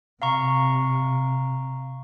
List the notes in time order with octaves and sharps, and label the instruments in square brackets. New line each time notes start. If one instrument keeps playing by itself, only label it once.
[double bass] C3 [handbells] F5 A#5 C#6